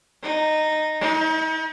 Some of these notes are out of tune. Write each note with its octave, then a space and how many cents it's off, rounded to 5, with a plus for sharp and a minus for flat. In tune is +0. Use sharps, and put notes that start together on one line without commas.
D#4 -10
D#4 +40